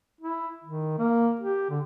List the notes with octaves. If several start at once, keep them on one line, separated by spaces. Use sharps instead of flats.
E4
D#3
A#3
G4
D3